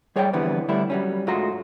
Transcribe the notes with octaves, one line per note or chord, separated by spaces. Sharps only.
G3 G#4 C#5 D5 F#5 G5
F2 D3 E3 G3 B3
D3 G3 A3 D4 E4
F#3 G3 C#4
G#2 G#3 A3 F4 F#4 A#5